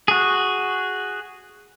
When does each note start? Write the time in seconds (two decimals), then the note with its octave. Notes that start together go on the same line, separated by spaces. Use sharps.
0.08 F#4 G#4